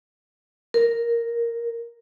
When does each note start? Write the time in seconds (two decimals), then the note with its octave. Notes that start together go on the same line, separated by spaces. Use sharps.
0.74 A#4